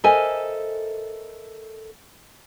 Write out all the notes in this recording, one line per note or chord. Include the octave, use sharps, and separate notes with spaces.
A4 A#4 C5 D#5 E5 G#5